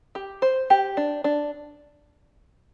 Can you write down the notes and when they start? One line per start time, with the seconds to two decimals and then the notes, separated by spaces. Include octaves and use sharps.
0.15 G4
0.42 C5
0.70 G4
0.97 D4
1.24 D4